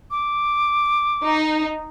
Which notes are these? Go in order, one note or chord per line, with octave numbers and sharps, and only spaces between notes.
D6
D#4